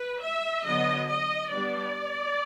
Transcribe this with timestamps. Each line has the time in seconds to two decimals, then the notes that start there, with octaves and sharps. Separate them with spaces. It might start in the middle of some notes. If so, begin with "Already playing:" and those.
Already playing: B4
0.22 E5
0.65 D3 F#3 B3 D#5
1.09 D#5
1.51 G3 B3 D4 D5